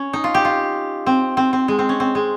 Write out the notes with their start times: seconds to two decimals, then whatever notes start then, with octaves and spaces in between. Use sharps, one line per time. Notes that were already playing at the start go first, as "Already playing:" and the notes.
Already playing: C#4
0.13 D#4
0.24 F4
0.34 G4
0.45 F4
1.06 C4
1.37 C4
1.53 C4
1.68 G#3
1.79 C4
1.89 C#4
2.00 C4
2.15 G#3